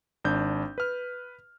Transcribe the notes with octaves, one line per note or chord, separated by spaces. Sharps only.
G#1 D4 G6
B4 F6